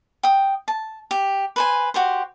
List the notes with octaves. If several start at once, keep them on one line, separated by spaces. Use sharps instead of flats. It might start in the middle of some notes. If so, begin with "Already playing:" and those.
G5 D#6
A5
G4
B4 C5 G#5
F#4 G4 C5